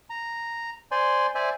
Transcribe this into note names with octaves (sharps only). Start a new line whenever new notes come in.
A#5
C5 D5 G#5 C6
C5 D5 E5 G#5